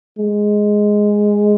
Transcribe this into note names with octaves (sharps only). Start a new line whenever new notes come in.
G#3